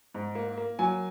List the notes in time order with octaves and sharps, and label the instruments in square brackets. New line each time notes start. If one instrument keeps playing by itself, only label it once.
[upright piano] G#2
A#3
A#3
F#3 G#5